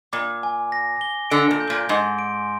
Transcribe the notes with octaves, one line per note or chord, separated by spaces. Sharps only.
A#2 D6
G#5
A#6
G7
D3 D7
A#2
G6
A#2
G#2 C6
D7